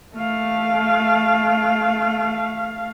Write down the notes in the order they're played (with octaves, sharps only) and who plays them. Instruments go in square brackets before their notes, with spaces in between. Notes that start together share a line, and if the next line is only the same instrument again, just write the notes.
[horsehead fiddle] A3 F5